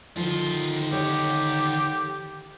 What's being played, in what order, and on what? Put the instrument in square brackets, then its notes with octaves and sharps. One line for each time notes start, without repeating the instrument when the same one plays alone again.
[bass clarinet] D3 [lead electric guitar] D#3 F4 [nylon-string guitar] F3
[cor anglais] G4 [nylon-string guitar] C#5